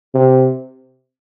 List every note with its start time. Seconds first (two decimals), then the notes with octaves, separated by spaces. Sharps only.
0.14 C3